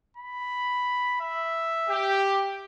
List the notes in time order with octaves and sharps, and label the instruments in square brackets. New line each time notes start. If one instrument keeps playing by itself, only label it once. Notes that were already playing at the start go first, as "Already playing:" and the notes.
[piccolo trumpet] B5
E5
[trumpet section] G4